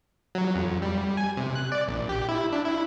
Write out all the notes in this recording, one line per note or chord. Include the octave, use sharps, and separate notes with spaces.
F#3
F2
G3
G#5
C3
F#6
D5
A#1
G4
E4
D4
E4